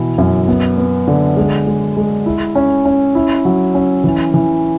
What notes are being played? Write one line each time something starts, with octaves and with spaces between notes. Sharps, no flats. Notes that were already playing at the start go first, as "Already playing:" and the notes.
Already playing: B2 E3 E4
F#2
B3
B3
D3
G#3
G#3
G#3
E4
C#4
C#4
E4
F#3
C#4
E3
E3